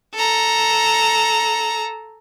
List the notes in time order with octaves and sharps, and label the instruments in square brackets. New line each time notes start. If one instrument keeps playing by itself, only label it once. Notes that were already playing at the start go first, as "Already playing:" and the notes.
[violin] A4 A#5